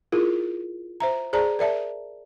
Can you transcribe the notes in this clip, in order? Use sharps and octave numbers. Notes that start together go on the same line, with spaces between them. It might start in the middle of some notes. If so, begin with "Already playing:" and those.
E4 F4 G#4 A#4
C5 E5 A#5
G#4 C5 D5 A5 A#5
A#4 D5 E5 A5